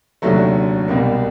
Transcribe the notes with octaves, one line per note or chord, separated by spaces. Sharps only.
F1 D#2 D3 F#3 A3
C2 B2 G3 A#3